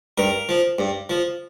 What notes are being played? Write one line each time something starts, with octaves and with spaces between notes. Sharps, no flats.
G2 A#4
F3
G2
F3